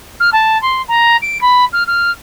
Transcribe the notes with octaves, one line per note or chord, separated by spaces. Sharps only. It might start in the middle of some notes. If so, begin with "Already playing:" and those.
F6
A5
C6
A#5
D7
B5
F6
F6